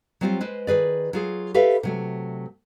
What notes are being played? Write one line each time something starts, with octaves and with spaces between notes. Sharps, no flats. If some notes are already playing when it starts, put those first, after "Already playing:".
F#3 G3 C4 F4 G4 C5
G#3 B4 C5
D#3 G#4 B4 D5
F#3 F4 G#4
G4 A4 B4 E5 F5
C3 F#3 A3